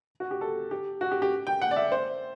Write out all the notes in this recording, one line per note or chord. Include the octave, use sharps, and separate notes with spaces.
F#4
G4
A4
G4
F#4
G4
G4
G5
F#5
D5
E5
C5